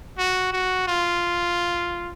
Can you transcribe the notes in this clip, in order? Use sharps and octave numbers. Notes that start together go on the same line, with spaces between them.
F#4
F#4
F4